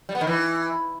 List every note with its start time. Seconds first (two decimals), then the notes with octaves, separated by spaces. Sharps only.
0.09 G3
0.15 B3
0.21 D#3
0.27 E3